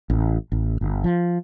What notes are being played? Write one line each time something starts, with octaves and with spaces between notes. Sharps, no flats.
A1
A1
G1
F3